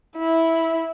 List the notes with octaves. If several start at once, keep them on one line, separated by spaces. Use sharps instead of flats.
E4